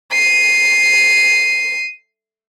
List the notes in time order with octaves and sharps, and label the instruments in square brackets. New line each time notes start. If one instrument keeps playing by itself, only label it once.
[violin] C7 D#7